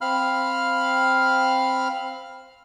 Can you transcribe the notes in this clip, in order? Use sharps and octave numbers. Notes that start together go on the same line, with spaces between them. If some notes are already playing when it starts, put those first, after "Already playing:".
C4 F5 B5 F6